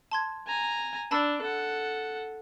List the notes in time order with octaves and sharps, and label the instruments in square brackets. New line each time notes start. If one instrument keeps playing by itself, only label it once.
[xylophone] A5 C6 G#6
[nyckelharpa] G#5 A#5
[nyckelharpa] D4 [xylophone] A5 B5 E6
[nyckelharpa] A4 F#5